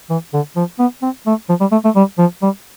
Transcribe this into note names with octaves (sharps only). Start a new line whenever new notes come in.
E3
D3
F3
B3
C4
A3
F3
G3
A3
A3
G3
F3
G3